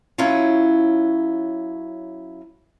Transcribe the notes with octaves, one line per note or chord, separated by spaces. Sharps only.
F#3 C#4 E4 F4